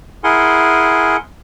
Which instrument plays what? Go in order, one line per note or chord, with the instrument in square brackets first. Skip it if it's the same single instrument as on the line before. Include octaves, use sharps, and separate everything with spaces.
[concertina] E4 G#4 A#4 F#5 G#5 C6